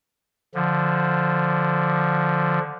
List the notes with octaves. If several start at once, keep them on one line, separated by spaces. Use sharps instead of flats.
D3 F3